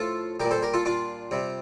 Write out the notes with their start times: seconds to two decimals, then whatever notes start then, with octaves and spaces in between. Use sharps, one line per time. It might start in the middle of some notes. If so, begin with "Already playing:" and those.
Already playing: A2 F3 F4 A4
0.40 A#2 G3 G4 A#4
0.51 A4 C5
0.62 G4 A#4
0.74 F4 A4
0.85 D4 F4
1.31 C3 G3